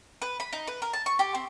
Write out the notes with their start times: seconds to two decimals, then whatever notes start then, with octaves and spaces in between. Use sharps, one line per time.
0.22 B4
0.40 B5
0.53 D#4
0.67 B4
0.82 A#4
0.93 A5
1.06 C#6
1.19 G4
1.35 C4